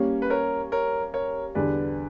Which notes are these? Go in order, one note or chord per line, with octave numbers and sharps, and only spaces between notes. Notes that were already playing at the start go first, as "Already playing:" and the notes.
Already playing: G3 A#3 C#4
B4
A#4 C#5
A#4 C#5
A#4 C#5
E2 D3 G3 B4 D5